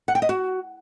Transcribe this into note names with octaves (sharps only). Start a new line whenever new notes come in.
F#5
G5
D#5
F#4